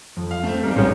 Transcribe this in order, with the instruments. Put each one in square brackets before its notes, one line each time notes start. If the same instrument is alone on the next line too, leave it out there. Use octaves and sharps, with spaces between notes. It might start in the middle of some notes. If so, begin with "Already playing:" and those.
[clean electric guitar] F2
[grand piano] F5
A3 C4
[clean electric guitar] G3 [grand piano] G#3 D#4 A#4
[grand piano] A1 G#3 [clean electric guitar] C#4 G4 C#5